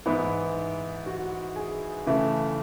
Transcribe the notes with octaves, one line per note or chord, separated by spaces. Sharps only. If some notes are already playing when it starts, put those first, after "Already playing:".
G#2 E3 B3 E4
F#4
G#4
C#3 E3 A3